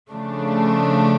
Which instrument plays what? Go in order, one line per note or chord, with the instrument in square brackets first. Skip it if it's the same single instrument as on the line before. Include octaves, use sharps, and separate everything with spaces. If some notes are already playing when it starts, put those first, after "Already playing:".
[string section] C#3 F3 A3 D4